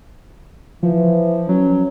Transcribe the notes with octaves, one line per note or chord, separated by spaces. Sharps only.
E3 F3
F#3 C#4